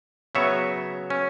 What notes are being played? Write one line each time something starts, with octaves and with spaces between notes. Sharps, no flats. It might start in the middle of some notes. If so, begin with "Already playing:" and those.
C#3 F#3 B3 C#5 E5
C#4